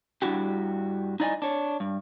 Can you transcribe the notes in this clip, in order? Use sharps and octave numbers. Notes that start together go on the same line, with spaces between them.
G2 G3 D4 E4 F#4 G4
D#4 E4 D5 D#5 G5 G#5
D4 C#5
G2